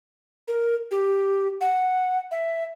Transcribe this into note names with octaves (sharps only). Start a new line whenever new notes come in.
A#4
G4
F#5
E5